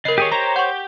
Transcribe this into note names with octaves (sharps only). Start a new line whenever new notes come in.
C#3 A#4 B4 D#5 C7
D#3 G4 G#4 C#5 G#5
G4 C5 C#5 A#5
F#5 C#6 G6